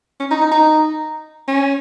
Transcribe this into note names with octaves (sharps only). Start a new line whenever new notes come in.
C#4
D#4
D#4
D#4
C#4